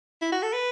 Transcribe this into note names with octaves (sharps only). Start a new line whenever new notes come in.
E4
F#4
A4
B4